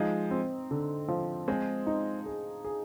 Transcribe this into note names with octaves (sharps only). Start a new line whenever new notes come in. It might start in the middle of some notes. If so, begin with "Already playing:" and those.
Already playing: F3 G#3 D#4
C4
D3
F3
G#3 C4 G#4
D#4
G#4
G#4